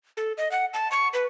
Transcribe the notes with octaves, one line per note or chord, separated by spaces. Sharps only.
A4
D#5
F#5
A5
C#6
B4